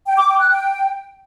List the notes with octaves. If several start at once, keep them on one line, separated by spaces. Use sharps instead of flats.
G5
D6
G5
F#6
G5